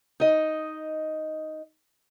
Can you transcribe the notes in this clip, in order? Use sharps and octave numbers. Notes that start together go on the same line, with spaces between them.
D#4 D#5